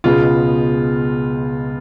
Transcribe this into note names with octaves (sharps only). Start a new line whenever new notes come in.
C#2 B2 G#3 B3 F4